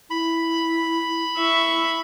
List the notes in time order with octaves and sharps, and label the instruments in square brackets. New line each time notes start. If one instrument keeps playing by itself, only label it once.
[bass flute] E4 [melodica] B5
[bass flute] E4 [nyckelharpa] E5 C#6